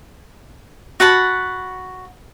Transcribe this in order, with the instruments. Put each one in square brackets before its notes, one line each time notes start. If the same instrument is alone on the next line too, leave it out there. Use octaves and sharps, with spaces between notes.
[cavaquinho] F#4 F#5 A5 B5